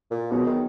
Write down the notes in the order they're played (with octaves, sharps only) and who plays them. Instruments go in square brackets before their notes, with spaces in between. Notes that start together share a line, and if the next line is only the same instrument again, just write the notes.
[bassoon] A#2
[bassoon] B2 [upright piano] F#3 B3 D#4 G#4
[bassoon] D#3